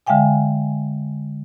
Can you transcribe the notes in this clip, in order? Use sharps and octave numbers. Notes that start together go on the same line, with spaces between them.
D3 G#3 E5 F5 G5 G#5